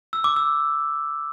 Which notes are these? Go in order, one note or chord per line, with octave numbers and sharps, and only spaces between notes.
E6
D6
E6